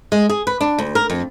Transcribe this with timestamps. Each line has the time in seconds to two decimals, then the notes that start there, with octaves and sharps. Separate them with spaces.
0.12 G#3
0.29 G#4
0.47 B4
0.61 D4
0.78 D2
0.95 A#4
1.10 F2